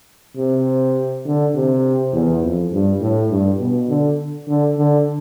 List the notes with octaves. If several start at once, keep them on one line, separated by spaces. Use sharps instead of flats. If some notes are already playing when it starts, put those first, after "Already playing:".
C3
D3
C3
E2
F2
G2
A2
G2
B2
D3
D3
D3